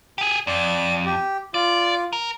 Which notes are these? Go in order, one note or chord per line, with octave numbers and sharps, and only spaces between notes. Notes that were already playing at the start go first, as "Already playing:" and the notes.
G4 G#4
F2 D5
G4
F4 D5
A#4